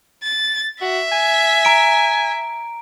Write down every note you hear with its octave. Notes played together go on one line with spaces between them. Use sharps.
A6
F#4 E5
G#5
A#5 D7